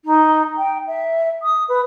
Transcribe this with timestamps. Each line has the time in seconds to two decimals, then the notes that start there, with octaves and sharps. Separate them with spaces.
0.04 D#4
0.57 G5
0.87 E5
1.42 D#6
1.68 B4